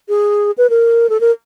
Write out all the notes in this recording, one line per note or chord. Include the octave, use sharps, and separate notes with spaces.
G#4
B4
A#4
A4
A#4